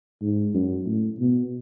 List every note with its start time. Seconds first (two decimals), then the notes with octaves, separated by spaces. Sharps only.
0.21 G#2
0.54 F#2
0.86 A2
1.19 B2